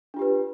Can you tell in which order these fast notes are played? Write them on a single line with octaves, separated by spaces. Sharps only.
D4 F4 G4 B4